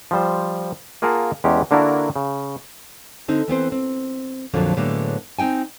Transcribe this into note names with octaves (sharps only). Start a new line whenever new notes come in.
F3 G3 C5
A#3 F4 G#4 A#4 F#5 A5
E2 G#3 C#4 G4
D3 A#3 D4 E4 F#4 A#4
C#3
D3 C4 D#4
E3 B3 C4 C5
C4
F2 A#2 D3 F3 F#3 A#3
A2 D3 F#3 G#3 A#3 B3
C4 D#4 G5 G#5